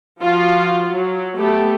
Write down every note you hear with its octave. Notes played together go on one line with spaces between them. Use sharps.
F3 F4 F#4
F#3
A3 B3 G4